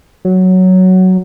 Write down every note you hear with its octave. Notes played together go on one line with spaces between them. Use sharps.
F#3